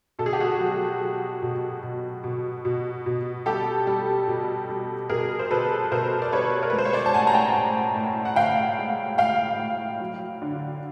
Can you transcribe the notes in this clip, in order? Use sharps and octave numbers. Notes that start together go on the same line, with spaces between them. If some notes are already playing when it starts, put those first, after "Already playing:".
B2 A4
G#4
G4
F#4 G#4
F#3
F#3
B2
B2
B2
B2
B2
G3 G4 A4
G3
B2
G3
B2 G#4 A#4
C5
B2 A4 B4
B2 A#4 C5
D5
G3 B4 C#5
A#4
B4
G#3
C5
C#5
C5 D5
A5
A2 F#5 G#5
A#5
G5 A5
A2
A2
F#5
A2 F5 G5
G#3
A2 F5 G5
A2
F#3
D3